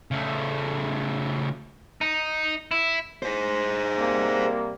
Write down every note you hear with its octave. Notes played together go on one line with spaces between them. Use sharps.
C#3 A3
D#4
E4
G#4 C5
C3 G3 A#3